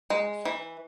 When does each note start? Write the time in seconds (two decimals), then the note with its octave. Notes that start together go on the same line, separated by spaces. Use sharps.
0.10 G#3
0.45 E3